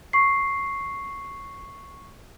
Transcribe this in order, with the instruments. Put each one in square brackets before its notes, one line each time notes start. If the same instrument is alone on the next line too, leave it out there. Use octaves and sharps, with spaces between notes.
[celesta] C#6 C7